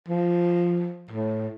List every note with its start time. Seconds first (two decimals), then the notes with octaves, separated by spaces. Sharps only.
0.08 F3
1.10 A2